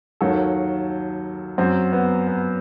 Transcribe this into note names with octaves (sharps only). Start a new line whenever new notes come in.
D#2 D#3 F#3 A4
F#2 F#3 C4
B3
B3